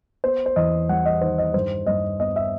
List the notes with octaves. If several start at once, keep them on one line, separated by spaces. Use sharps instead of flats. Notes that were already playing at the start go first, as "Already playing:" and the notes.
B3 C5
C5
E2 D#5
G3 F#5
D#5
D#3 C5
D#5
G2 C5
G2 D#5
B3 D#5
E5